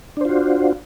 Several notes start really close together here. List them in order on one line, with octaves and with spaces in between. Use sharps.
D4 C5 F4 F#4